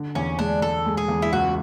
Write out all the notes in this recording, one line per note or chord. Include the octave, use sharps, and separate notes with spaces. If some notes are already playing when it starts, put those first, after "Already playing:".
Already playing: D3
E2 C#4
G#3 D4
G#3 A4
G#3
G#4
E2
E4
C#2 F#4